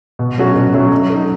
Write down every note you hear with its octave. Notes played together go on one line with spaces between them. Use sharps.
B2
F#3 A3 C#4 F#4
B2
F#3 A3 C#4 F#4
F#3
A3 D#4